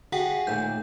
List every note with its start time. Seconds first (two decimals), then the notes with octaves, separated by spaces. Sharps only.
0.12 D3 F#4 G#4 F#5 G5
0.47 D#2 A#2 A3 G6